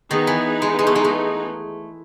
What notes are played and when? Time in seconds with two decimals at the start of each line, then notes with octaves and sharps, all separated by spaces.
0.10 D#3 B3 D#4 G#4
0.27 E3
0.62 G#3
0.79 G#3
0.87 A3
0.95 G#3
1.04 A3